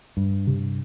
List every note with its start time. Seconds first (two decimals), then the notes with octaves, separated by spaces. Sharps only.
0.17 G2
0.47 C3